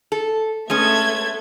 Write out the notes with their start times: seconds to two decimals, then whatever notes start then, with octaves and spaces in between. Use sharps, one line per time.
0.12 A4
0.70 G#3 A3 B3 C#4 A4 G#6